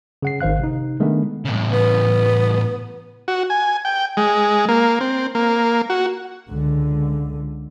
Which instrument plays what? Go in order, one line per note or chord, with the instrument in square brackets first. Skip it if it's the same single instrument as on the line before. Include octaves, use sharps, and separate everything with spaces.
[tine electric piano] C#3 F#5 C7
G#1 D#3 C5 F5 F#6
C3 D#4
D#3 G#3 A3 B3 D4
[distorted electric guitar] A2 C#3
[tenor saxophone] B3
[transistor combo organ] F#4
G#5
G5
G#3
A#3
C4
A#3
F#4
[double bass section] C#2 D3